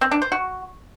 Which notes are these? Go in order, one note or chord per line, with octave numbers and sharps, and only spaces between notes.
C4
D4
C5
F#4